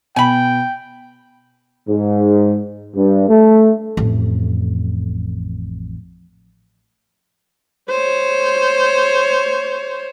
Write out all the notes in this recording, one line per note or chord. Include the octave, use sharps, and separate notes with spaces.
B2 G5 G#5 B5
G#2
G2
A3
A1 F2
C5 C#5